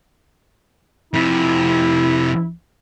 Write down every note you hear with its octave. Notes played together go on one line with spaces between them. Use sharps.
F2 C3 E4